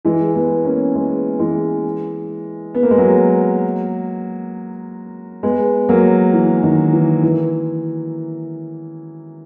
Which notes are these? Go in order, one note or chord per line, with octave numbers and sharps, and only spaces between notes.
E3 G#3
G#3 B3
A#3 C#4
G#3 B3
E3 G#3
B3
A#3
G#3
F#3 A#3
G#3 B3
F#3 A#3
E3
D#3
E3
E3